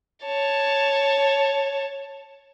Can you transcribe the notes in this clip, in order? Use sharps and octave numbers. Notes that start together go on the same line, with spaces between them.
C#5 A5